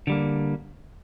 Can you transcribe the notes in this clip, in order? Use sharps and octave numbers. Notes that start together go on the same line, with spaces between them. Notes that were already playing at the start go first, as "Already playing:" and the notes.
D3 G3 A#3